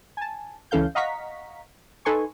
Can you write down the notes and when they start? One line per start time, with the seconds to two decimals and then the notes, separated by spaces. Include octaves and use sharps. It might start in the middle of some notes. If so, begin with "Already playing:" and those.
0.17 G#5 A5
0.71 C#2 E3 C#4 A4 F5 G6
0.95 D#5 F5 F#5 A#5 C#6 B6
2.05 D#4 A4 B4 G#5 C6 C#6